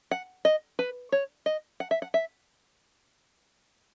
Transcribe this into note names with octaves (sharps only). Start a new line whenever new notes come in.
F#5
D#5
B4
C#5
D#5
F#5
E5
F#5
E5